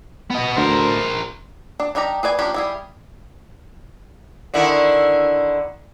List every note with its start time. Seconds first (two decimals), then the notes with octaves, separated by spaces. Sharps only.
0.30 B3 D#5
0.57 D2 A#4 C5
1.80 D4
1.95 G3 D4 D#4 G4 A#5
2.23 G#4 B4 D5 G#5
2.39 F3 A#3 C#4 D4 G4
2.54 G3 E4 G#4
4.54 D3 D#3 E4